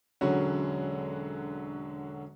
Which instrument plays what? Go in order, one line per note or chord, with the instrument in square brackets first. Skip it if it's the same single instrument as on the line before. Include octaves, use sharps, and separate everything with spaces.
[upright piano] E1 D3 F#3 C#4 F#4